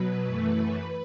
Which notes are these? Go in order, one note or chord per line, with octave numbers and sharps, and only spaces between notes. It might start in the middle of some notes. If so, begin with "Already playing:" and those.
Already playing: B2 F#3 B4
F#2 E3 A3